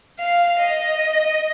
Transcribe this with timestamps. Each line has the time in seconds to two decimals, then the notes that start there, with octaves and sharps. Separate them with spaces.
0.20 F5
0.60 D#5